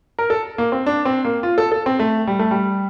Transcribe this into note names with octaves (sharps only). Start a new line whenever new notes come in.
A#4
A4
A#3
C4
D4
C4
A#3
F4
A4
A4
C4
A3
G3
A3
G3